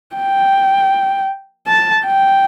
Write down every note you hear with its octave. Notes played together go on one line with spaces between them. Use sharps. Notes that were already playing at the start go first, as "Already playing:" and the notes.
G5
A5
G5